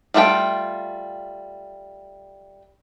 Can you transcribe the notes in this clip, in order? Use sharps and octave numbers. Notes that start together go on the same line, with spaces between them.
G3 A3 F4 A4 G5